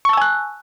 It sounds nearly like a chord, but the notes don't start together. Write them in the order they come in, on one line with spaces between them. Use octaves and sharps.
C#6 A5 E6 G#5 F#6